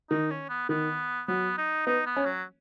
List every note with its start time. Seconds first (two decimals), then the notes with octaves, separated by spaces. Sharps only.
0.10 D#3 D#4
0.31 C#4
0.49 B3
0.69 D#3 B3
1.28 F#3 B3
1.58 D#4
1.86 B3 D#4
2.07 B3
2.16 C#4
2.26 F#3